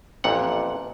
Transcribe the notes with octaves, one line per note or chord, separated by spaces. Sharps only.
A1 F2 A#2 F#5